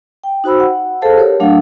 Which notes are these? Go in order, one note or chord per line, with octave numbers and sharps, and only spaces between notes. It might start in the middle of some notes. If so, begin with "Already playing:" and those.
G5
D#4 F#4 C5 B5 E6
F#5
G#4 A4 C5 F5 A5
G4 A#4 C#5
F#3 A3 D4 F5 F#5